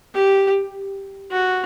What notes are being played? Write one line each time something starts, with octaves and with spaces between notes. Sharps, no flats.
G4
F#4